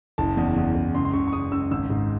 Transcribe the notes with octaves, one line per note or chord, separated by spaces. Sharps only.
F#1 A5
E2
E2
F#1
C#2 C6
C6
C#2 C#6
C#6
C#2 D#6
C#2 E6
G#1 E6
G#2